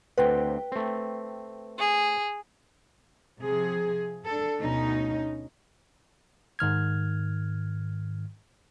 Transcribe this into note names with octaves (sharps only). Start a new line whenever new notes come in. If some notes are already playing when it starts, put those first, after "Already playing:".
D2 C4 B4 F#5 G5
A3 C4
G#4
C3 F3 G#4
D4 A4
D2 B2 C#4 D#4
G#2 D#3 F6 G#6